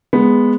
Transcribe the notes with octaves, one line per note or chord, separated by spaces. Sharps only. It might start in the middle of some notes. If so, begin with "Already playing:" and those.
G#3 B3